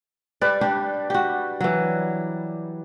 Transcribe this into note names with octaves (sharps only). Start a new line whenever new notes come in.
G3 B4 D5
D4 G4
F#4 G4
E3 F#3